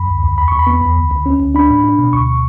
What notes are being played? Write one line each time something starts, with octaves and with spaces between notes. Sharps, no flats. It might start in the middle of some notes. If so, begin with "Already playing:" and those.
Already playing: F#2 B5
D2
D2
E2 B5
E2 C#6
B5
B3
E2
D2
D2
C#4
D2
D4 B5
A2
D4
B2
D2 C#6